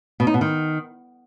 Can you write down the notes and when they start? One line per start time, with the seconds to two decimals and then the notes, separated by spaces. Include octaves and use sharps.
0.20 B2
0.27 D#4
0.34 B2
0.41 D#3